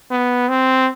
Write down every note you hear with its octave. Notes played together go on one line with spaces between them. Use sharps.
B3
C4